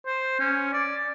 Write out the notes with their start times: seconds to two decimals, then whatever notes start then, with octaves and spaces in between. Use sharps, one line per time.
0.06 C5
0.39 C#4
0.73 D5